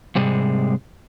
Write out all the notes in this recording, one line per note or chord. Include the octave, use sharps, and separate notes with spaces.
G#2 C3 G3 G#3